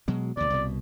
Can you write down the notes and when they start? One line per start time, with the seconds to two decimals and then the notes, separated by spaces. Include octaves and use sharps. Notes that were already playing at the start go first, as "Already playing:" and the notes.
0.08 B2 F#3 G#3
0.37 D2 B2 D5
0.50 C2 B2